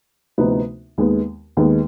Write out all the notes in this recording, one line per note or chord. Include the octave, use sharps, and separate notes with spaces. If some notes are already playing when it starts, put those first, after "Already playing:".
D2 C3 F3 B3 D#4
D#2 D#3 G#3 B3
D#2 D#3 G#3 B3